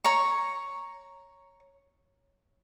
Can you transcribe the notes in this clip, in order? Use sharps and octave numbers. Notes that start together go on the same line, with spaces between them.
C#5 A#5 C#6